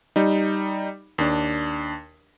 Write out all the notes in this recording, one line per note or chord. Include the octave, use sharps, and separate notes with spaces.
G3 D#4
D#2 D4